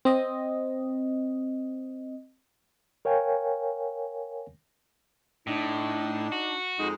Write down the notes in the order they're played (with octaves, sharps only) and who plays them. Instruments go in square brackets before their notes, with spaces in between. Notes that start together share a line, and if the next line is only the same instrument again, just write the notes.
[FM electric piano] C4 D#5
[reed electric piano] A#4 C#5 F5 G5 G#5
[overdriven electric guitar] A2 [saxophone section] D4 D#4
[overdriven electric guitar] F#4
[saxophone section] F2 G#3 D#4